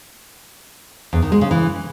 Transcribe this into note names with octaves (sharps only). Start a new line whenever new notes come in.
E2
D#3
G#3
C#3
E3